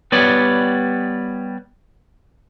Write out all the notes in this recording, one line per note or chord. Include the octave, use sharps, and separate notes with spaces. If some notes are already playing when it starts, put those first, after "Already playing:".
G3 B3 B4 C#5 D5